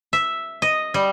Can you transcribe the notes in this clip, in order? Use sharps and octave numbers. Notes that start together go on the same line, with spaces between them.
E5
D#5
G3